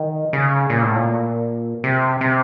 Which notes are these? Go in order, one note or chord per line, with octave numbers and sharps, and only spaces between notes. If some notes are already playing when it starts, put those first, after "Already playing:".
Already playing: D#3
C#3
A#2
A2
A#2
C3
C3